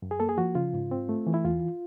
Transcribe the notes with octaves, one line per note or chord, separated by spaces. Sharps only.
F#2
G#4
A#3 A4
G#4
F3 F#4
C#3 F4
G#2
C4
A3
E3
E4
E2 F4